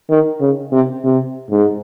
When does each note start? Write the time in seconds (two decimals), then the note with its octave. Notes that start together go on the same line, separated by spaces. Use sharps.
0.10 D#3
0.41 C#3
0.72 C3
1.04 C3
1.51 G#2